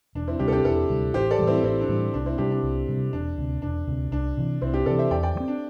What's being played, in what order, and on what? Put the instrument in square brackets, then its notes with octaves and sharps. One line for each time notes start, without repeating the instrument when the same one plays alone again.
[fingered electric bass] E1 [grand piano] D4
[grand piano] C4 E4
[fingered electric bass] D2 C3 G3 [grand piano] D4 G4
[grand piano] A4
D4 G4
[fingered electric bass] E1 [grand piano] E4 A4
[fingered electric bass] D2 C3 G3
[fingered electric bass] A1 [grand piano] G4 C5
[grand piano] A4 D5
[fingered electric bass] A2 E3 G3
[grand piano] C4 E4
[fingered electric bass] A1 [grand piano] C4 E4
[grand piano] D4
[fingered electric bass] A2 E3 G3
[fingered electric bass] C2 [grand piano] D4
[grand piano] C4 E4
[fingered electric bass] C3 G3 [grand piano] D4 G4
[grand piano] D4
[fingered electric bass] C2
C3 G3
[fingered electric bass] E1 [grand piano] D4
[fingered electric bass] D2 C3
[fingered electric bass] E1 [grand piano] D4
[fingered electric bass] D2 C3
[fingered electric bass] C2 [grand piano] D4
[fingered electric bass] C3 E3
[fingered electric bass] C2 [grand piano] C4 E4
[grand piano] D4 G4
[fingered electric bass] C3 E3 [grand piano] A4 D5
[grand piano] C5 E5
[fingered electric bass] E2 [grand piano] D5 G5
[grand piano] D5 G5
[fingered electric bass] E3
C4
[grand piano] D4